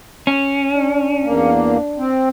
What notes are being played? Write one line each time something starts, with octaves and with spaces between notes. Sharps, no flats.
C#4
D4
E2 A#3
C4